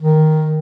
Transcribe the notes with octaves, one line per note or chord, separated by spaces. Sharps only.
D#3